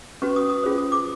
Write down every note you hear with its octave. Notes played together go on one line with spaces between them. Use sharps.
C#4 F#4 B4 C#6
D#6
D#6
C#4 F4 G#4 C5
D#6
D6